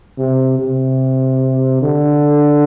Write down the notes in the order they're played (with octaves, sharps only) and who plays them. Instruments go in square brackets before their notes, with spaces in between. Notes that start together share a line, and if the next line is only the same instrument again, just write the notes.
[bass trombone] C3
C3
D3